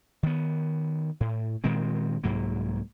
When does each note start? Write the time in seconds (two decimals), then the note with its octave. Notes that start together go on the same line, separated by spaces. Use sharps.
0.23 D#3 B3
1.20 A2
1.64 A#2 D#3 G#3 C4
2.24 C2 G#2 F#3 A#3